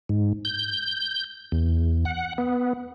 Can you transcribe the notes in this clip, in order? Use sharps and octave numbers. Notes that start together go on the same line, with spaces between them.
G#2
G6
E2
F#5
B3